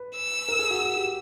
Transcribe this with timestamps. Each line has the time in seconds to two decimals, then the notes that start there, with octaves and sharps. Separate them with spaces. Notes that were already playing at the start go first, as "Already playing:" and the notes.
Already playing: B4
0.16 E6
0.49 A#4
0.59 G#4
0.70 F#4
0.81 F#4
0.97 G4